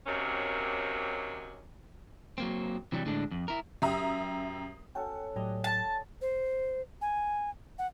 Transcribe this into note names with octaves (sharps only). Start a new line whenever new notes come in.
C3 D#3 F#3 A#3 C#4
F#3 A#3 C4
C3 E3 F#3 G3
A2 D3 G#3 D4
F2
E4 A#4
F#2 G4 E5 A#5 D#6
C#4 F#4 A4 G5
A2 F#3 G3 D#5
A5
C5
G#5
F#5